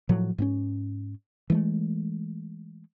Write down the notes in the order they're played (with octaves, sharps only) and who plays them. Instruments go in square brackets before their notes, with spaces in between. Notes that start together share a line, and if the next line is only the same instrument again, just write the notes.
[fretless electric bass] A2 F3 F#3
G#2 C4 C#4
E3 G#3 A3